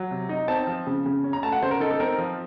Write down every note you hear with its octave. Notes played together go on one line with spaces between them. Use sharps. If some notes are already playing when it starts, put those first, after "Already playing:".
Already playing: F#3
C3
D#4
C4 A5
F3
C#3
C#3
C#4
A#5
A3 A5
F#5
C#3 C5
A#4
D#4 A4
A4
C4 A#4
F3